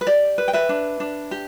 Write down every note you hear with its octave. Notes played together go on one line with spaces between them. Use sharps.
B4
G4 D5
B4
G5
B4 E5
D4
D4
G4